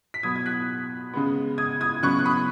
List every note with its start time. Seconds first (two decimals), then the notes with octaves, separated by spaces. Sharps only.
0.14 B6
0.23 B2 F#3 B3 D#6 G#6
0.36 G#6
0.46 F#6 B6
1.13 C#3 G#3 B3
1.58 D#6 G#6
1.81 D#6 G#6
2.03 C#3 F#3 B3 C#6 F#6
2.19 F#6
2.25 B5 D#6